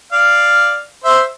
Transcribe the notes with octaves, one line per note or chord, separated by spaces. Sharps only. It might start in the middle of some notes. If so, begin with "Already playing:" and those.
D5 F5
C5 E5